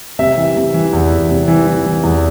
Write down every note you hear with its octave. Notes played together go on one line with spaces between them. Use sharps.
C3 E5
E3
C3
E3
E2
E2
C3
E3
E3
E3
E2